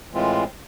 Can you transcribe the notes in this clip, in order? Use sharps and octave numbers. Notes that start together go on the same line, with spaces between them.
A2 E3 G#3 C4 F4